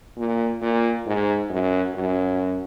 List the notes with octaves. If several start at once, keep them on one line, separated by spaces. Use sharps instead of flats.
A#2
A#2
G#2
F#2
F#2